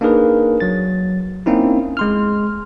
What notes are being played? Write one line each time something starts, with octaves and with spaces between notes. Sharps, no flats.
A#3 D4 D#4 G#4 A#4 B4
F#3 A6
A#3 C4 C#4 D#4 E4
G#3 C6 F6